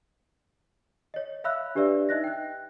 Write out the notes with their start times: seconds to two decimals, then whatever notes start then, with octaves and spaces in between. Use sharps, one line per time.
1.14 C#5 D#5
1.44 C#5 E5 F5 B5 E6 F#6
1.75 D4 G4 B4 D5 E5 E6
2.09 D#4 D#5 F#6 A#6
2.24 G5 F#6